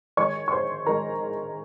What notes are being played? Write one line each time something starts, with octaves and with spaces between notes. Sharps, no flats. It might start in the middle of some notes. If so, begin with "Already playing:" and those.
D#3 G#3 C#5 C#6
C#6
C5 C6
D#3 G#3 A#4 A#5